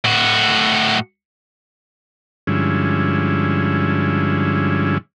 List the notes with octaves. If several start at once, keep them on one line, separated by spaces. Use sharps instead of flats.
A2 F#4
G2 D3 F3 G#3 C#4 E4